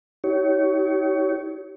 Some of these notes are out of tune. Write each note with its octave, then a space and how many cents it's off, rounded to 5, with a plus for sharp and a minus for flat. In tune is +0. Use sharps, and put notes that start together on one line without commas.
D#4 +40 G4 -30 C#5 +15